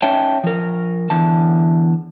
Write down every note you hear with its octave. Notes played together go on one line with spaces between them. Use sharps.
C#4 D#4 C#5 E5 G5 A5
F3 A#4
E2 D3 E3 A5